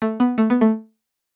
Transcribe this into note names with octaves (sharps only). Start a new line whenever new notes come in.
A3
B3
A3
B3
A3